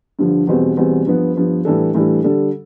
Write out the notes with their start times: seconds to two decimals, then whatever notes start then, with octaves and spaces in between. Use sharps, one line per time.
0.19 G2 D3 F3
0.47 E2 B2 G3 C4
0.77 E2 B2 G3 C4
1.07 G2 F3 B3
1.36 G2 F3 B3
1.65 A2 E3 G3 D4 A4
1.95 A2 E3 G3 D4 A4
2.24 D3 G3 D4 A4